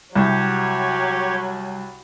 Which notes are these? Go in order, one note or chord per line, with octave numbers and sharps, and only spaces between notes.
C2 F#3 G4 C#5